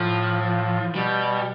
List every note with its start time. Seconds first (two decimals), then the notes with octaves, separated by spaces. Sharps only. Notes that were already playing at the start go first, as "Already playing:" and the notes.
Already playing: A2 F3
0.95 B2 G3